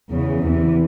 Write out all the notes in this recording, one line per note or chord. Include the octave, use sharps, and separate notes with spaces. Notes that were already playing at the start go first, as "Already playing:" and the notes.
E2 C#3 E3
E2 C3 E3